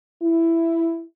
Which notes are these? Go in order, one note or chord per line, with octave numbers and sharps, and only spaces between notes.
E4